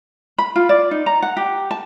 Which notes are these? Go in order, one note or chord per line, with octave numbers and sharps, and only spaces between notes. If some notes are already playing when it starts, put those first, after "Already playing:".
B5
F4
D5
D#4
A#5
F#5
G4
A5